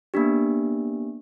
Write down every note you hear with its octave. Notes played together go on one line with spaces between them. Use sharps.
A#3 B3 D4 G4